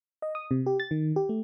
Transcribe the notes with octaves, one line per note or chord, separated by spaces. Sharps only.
D#5
D#6
C3
G4
A6
D#3
G4
A3